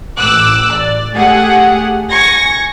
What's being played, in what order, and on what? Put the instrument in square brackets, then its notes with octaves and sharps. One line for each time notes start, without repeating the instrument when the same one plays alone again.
[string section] A1 D6 E6 F#6
D5
A3 G4 G#4 F#5
G#5 C#6 G#6 A#6